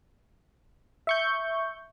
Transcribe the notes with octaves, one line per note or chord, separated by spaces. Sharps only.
E5 C#6 G6